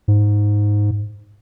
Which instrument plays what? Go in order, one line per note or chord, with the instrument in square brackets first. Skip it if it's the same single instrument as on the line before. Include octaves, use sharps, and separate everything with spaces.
[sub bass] G#2